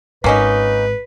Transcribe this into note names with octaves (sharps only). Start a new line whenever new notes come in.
G#1 A#3 C#4 D#4 B4